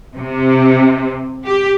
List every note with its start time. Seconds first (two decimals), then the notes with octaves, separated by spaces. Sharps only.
0.19 C3
1.46 G4